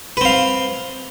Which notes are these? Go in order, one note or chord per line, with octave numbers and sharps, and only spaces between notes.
C4 B4 F5